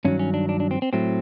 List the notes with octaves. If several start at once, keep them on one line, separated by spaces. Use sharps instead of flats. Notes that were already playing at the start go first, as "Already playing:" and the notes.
G2 D#3 F#3 C#4
C#4
D4
D4
D4
C4
C4
A2 F#3 A3 C4